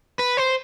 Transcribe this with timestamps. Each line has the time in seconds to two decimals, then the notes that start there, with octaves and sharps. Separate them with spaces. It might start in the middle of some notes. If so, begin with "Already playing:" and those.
0.19 B4
0.37 C5